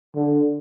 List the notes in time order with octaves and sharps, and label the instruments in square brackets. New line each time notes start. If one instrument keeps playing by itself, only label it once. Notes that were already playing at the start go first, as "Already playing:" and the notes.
[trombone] D3